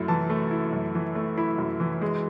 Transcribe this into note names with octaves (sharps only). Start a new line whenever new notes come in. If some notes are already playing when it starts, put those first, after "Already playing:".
Already playing: F#2 A3 E4
E3 A5
A3
E4
F#2
E3
A3
E4 B5
F#2
E3
G#3